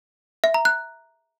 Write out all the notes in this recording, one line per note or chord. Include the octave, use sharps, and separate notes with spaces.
E5
A#5
F#6